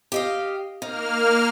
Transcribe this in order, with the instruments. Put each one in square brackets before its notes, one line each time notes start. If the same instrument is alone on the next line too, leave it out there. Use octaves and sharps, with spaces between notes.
[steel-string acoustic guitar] G4 D#5 F5
[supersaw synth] A#3 F6 [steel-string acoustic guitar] D#4